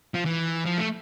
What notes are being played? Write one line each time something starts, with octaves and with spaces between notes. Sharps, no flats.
F3
E3
F3
A3